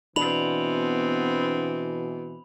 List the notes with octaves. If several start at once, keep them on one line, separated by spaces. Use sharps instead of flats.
B2 E3 B3 C4 D4 B5 F7 F#7